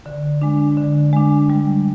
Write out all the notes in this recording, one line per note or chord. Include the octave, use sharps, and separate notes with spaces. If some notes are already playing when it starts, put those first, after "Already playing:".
D3
G#3 D4
D3
G#3 D4
G3